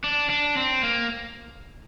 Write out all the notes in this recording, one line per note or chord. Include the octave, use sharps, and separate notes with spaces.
D4
D4
C4
A#3